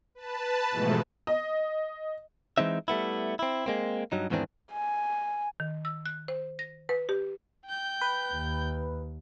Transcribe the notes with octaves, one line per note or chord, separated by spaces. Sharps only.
B4 A5
G#2 B2 E3 F3 G#3 A3
D#5
E3 G#3 C4 D#4 E5
G3 A3 B3 E4
C4 E4
G#3 A#3 C4
G2 F#3 D#4
E2 G#2 D#3 E3 C4 D4
G#5
D#3
E6
F#6
C5
A#6
B4
G4
G5 G6
B4
D#2